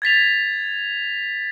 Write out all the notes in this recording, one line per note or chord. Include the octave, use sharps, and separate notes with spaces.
G#6 A6 B6 F7